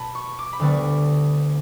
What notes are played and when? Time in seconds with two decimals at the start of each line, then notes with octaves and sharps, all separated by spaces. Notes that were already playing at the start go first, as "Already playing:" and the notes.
Already playing: B2 A5 B5
0.15 C#6
0.39 D6
0.53 B5
0.60 D2 D3 G3 B3 C#6